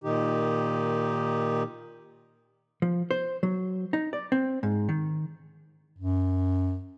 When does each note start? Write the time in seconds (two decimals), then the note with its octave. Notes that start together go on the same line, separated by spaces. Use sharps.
0.04 A#2 D#3 D#4 G4
2.82 F3
3.11 C5
3.43 F#3
3.93 D#4
4.13 D5
4.32 C4
4.63 G#2
4.89 D#3
5.97 F#2